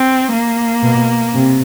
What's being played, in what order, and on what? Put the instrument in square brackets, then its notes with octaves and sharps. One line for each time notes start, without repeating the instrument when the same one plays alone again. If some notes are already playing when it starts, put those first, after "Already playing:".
Already playing: [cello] C4
A#3
[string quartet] B2
C3